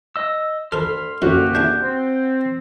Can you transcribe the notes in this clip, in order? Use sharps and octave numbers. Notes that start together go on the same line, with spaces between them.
D#5 E6
D2 A4 A#4 B5 C6 F6
C2 F#2 D3 A#3 F#4 G4
D4 E4 G#4 G6
C4